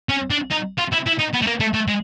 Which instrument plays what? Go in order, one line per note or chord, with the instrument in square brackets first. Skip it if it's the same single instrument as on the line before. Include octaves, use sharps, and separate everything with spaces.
[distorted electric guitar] C#4
D4
D#4
F4
E4
E4
D#4
B3
A3
A#3
A3
A3
G#3